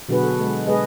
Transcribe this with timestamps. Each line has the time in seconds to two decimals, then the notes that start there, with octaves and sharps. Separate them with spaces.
0.09 B2 D3 F#3 F#4 G#4 B4
0.24 A4
0.40 G#3
0.67 G#3 G#4 B4 D#5